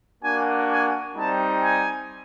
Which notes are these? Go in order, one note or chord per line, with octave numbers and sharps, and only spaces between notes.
A#3 D4 F#4 G#5
G#5
G3 C4 D#4 A5
G#5